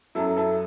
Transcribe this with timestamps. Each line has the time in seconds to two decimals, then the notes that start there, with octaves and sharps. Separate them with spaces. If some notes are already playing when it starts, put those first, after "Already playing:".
0.15 F#2 F#3 E4 A4
0.37 E4 A4